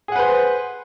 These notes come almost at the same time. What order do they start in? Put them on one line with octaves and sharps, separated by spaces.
G#4 F#5 B4 C5